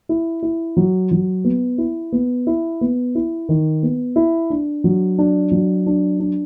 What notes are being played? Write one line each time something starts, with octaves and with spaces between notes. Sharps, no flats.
E4
E4
F#3
F#3
B3
E4
B3
E4
B3
E4
D#3
B3
E4
D4
F#3
D4
F#3
D4
D4